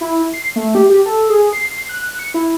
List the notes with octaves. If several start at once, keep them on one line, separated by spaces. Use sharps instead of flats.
E4
C7
A3
G4
G4
A4
G#4
C7
F#6
C#7
E4